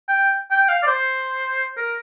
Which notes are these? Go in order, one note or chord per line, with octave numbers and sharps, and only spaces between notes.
G5
G5
F5
D5
C5
A#4